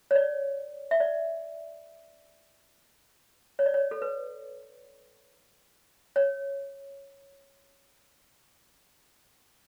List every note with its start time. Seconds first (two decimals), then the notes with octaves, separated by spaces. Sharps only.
0.11 C#5
0.15 D5
0.91 E5
1.00 D5
3.59 C#5
3.66 D5
3.74 C#5
3.91 A4
4.02 B4
6.16 C#5